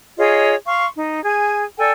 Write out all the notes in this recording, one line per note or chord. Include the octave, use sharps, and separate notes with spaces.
F4 G#4 C#5 D#5
F5 C6 C#6
D#4
G#4 G#5
A4 D5 G5 G#5